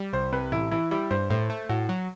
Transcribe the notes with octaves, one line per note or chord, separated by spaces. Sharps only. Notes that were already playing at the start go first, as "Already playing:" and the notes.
Already playing: G3
C2 C5
C3 B4
A1 E4
E3 E4
G3 E4
G2 C5
A2 C5
A3
A2 F#4
F#3